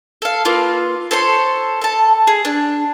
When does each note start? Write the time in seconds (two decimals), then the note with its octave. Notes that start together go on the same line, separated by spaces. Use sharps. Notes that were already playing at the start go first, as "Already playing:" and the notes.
0.22 A4 F5
0.45 A#3 F4 B4
1.11 A4 C5 C#5 C6
1.81 A4 A5
2.27 G#4
2.45 D4